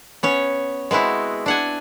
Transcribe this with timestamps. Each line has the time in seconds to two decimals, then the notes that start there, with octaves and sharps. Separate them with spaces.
0.23 B3 C#4 C#5
0.91 G#3 B3 C4 E4 F#4
1.46 D4 F#5 G#5